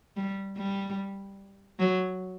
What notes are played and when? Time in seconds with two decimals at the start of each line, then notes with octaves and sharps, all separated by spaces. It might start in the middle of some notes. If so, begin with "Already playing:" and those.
0.16 G3
0.57 G3
1.79 F#3